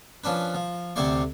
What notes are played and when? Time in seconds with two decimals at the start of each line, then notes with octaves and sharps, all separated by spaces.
0.24 F3 C#4 D4 B4
0.54 F3
0.96 D2 C3 C5 D5 C#6